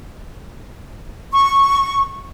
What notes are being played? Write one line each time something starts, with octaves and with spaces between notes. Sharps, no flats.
C#6